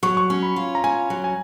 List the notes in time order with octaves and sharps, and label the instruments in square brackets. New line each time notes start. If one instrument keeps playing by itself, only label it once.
[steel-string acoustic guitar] F#3 [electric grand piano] C#6
[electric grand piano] C#6
[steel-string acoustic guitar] C#4
[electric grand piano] B5
[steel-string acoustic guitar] F4
[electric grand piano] A#5
[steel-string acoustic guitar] C#4 [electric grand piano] G#5
[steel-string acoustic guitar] F#3
[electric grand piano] G#5